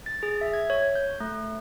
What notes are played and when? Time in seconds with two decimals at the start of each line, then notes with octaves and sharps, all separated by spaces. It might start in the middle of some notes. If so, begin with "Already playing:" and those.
0.06 A6
0.23 G#4
0.41 E5
0.53 G#6
0.70 C#5
0.95 G6
1.20 A3